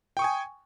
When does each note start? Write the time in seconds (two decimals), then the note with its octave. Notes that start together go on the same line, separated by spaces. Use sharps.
0.17 G5
0.19 C#6
0.22 D#6
0.24 G#5